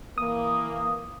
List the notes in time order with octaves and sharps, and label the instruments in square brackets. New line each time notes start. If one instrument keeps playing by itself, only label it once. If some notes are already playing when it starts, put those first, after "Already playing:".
[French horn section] E3 A#3 [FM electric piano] D#6